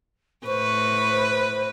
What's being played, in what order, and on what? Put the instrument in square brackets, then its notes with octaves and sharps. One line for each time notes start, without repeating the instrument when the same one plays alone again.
[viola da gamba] A2 B4 [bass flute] C5 [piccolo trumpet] C#6